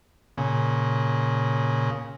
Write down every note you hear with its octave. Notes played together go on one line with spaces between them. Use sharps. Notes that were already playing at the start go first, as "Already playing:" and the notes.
A#2 C#3